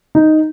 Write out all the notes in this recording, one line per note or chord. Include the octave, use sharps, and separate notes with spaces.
D#4